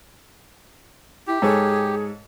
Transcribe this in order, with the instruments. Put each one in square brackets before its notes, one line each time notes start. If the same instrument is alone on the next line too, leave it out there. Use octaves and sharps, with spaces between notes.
[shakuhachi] E4 [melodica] G4
[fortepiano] G#2 A4 C#5 [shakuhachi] G#4